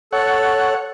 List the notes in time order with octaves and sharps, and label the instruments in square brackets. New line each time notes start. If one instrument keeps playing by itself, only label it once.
[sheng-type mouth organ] A4 [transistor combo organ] C#5 F#5